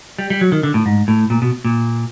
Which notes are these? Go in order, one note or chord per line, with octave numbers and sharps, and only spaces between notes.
G3
G3
F#3
D#3
D3
A2
G#2
A2
A#2
B2
A#2